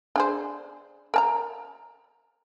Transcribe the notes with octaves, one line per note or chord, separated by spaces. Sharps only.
D4 G#4 C5
A#4 A5 A#5